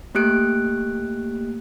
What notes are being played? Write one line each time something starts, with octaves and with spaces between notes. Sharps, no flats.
A3 A#3 G4 F#6 D7